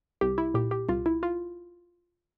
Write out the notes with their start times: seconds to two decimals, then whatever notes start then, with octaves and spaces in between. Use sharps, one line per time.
0.21 C2 G4
0.38 E4
0.54 A#2 G4
0.71 G4
0.89 C2 F4
1.06 E4
1.23 F4